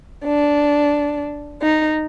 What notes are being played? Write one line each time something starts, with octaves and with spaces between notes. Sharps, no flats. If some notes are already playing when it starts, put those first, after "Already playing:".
D4
D#4